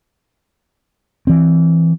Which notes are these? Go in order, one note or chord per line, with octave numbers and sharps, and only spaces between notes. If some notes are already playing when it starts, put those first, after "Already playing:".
E3 C4